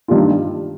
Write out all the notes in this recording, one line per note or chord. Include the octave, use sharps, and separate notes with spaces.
G2 D#3 G3 D4 F4